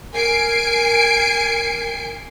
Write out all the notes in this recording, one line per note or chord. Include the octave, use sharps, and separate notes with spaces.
A#4 G#5 C7 D7